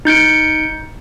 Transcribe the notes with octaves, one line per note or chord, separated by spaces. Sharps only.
D#4 G6 C#7 D7